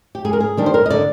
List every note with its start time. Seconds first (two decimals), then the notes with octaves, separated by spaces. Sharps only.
0.15 G4
0.25 G#2 G#4
0.33 A#4
0.40 G#4
0.57 D#3 G3 D4
0.66 C5
0.74 A#4
0.86 D#5
0.90 D3 D5